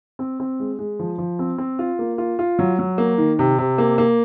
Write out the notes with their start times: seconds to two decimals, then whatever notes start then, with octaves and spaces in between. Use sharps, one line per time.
0.19 C4
0.40 C4
0.60 G#3
0.79 G#3
0.99 F3
1.18 F3
1.39 C4
1.58 C4
1.79 F4
1.99 A#3
2.18 F4
2.39 F4
2.59 F#3
2.79 F#3
2.98 A#3
3.18 D#3
3.39 C3
3.59 C3
3.78 A#3
3.98 A#3